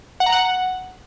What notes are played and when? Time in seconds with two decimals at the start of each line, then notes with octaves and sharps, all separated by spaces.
0.20 F#5
0.26 A#5
0.32 F#5